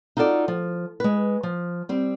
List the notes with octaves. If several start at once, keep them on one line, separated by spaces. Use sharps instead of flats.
D#4 F4 F#4 A4 D5
F3
G#3 B4
F3
G3 C4